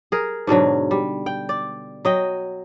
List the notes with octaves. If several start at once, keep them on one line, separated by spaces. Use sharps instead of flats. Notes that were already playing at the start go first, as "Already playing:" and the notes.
G#4 A#4
G#2 B2 D3 F#3
G3
G5
D5
F#3 D#5 G5